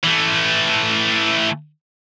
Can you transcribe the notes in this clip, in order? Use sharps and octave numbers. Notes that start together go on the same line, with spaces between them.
E3 A3